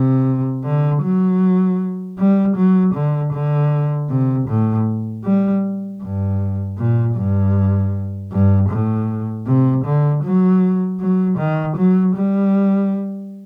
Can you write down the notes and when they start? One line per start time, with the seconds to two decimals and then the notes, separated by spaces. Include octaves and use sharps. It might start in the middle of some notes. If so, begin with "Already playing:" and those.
Already playing: C3
0.64 D3
1.03 F#3
2.18 G3
2.56 F#3
2.94 D3
3.33 D3
4.10 C3
4.48 A2
5.24 G3
6.02 G2
6.78 A#2
7.16 G2
8.32 G2
8.70 A2
9.47 C3
9.85 D3
10.24 F#3
11.00 F#3
11.38 D#3
11.77 F#3
12.16 G3